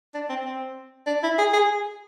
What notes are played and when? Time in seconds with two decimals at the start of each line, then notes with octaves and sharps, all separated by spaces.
0.14 D4
0.29 C4
0.45 C4
1.06 D4
1.23 E4
1.38 G#4
1.53 G#4